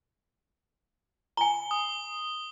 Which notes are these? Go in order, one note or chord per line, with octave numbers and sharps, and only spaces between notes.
G#5 A#5 G7
D#6